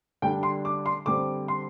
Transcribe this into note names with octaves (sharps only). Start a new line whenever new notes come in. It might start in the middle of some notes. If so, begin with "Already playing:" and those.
D3 G3 D4 G5
C6
D6
C6
D3 G3 C4 D6
C6